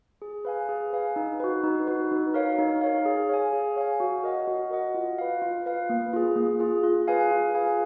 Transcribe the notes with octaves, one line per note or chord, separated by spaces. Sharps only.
G#4
B4 F5 G#5
G#4
B4 F5 G#5
D#4
F#4 B4
D#4
F#4 B4
D#4
A#4 C#5 F5
D#4
A#4 C#5 F5
G#4
C#5 F5 G#5
G#4
C#5 F5 G#5
F#4
A#4 D#5 F#5
F#4
A#4 D#5 F#5
F4
B4 F5
F4
B4 F5
A#3
F4 G#4
A#3
F4 G#4
F4
G#4 B4 F5 G#5
F4
G#4 B4 F5 G#5